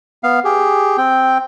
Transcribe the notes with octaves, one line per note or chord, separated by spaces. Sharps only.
B3 F5
G4 G#4
C4 G5